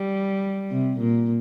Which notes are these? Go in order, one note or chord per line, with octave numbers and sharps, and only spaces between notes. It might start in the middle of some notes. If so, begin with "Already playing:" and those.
Already playing: G3
C3
A#2